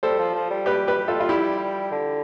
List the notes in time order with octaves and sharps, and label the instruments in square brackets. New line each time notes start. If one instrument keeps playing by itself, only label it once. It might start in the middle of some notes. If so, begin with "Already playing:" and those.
[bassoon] G3 [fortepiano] A4 C5
[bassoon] F3
F3
G3
[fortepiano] G4 B4
G4 B4
F4 A4
F4
E4 G4
[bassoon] D3